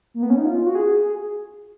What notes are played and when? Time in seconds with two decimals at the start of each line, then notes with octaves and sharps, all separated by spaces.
0.14 A#3
0.23 B3
0.30 C#4
0.38 D#4
0.45 F4
0.66 F#4
0.75 G#4
1.06 G#4